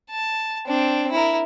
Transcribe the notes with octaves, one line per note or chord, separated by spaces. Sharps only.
A5
C4 D4
E4 A#4